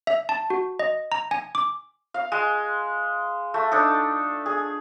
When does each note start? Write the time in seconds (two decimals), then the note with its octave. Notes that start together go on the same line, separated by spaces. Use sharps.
0.07 E5
0.29 A5
0.50 F#4
0.79 D#5
1.12 A#5
1.31 G#5
1.55 D6
2.14 F5
2.32 G#3
3.54 A3
3.72 D4 D#4 A4
4.46 G#4